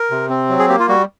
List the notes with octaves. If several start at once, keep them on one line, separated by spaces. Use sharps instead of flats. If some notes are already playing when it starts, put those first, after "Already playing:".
Already playing: A#4
C3
C4
F#3
G#4
A#3 G4
F4
G3 F#4